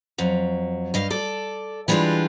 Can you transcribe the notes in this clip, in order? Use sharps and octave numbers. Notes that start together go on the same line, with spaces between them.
F2 F#3
G2 D#5 F5
A4 D5
E3 G3 G#3 D4 F4